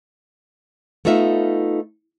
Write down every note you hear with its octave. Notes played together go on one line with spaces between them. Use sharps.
A3 B3 D#4 F4 E5